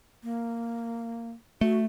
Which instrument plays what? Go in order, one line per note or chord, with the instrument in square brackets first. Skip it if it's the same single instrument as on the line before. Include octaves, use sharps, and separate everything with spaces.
[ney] A#3
[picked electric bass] A3 [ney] F#4